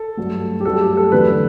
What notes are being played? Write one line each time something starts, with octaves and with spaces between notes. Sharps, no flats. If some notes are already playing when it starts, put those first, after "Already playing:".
Already playing: A4
G2 F#3 A3
G4
G2 F#3 A3 A4
G4
A4
E2 D3 F#3 A3 B4